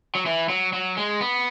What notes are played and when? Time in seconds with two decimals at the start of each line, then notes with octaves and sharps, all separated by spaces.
0.15 F#3
0.26 E3
0.49 F#3
0.73 F#3
0.97 G#3
1.21 B3